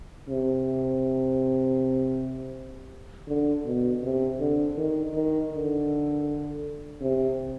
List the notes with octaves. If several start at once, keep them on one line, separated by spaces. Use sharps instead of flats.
C3
D3
B2
C3
D3
D#3
D#3
D3
C3